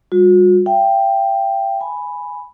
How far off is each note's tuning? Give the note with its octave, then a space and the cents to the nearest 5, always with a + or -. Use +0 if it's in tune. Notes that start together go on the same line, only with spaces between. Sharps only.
G3 +20 F#4 -40
E5 +45 G5 +0
G#5 +0 B5 +0